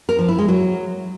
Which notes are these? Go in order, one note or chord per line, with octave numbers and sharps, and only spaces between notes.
A#4
F3
E4
G#3
F#3